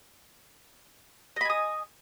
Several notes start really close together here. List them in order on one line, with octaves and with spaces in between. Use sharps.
D#5 B5 G#5 D#6